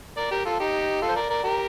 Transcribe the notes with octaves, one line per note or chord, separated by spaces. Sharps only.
A#4 D5
G4 A#4
F4 A4
D#4 G4
F4 A4
C5
A#4 D5
A#4 D5
G4 A#4